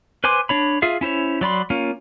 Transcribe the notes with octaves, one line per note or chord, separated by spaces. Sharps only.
B4 C5 G#5 C6 D6
D4 C#5 B5
F4 G#4 E5 F5
C#4 E4 C5 C#5
F#3 D5 B5 C6
A#3 C#4 F4